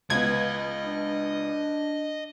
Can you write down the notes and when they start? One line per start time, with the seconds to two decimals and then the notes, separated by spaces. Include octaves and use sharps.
0.10 C#2 B3 D#5 G#6
0.86 D4